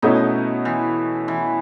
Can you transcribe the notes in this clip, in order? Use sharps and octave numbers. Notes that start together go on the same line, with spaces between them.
B2 A3 B3 C#4 D#4 E4
E3
E3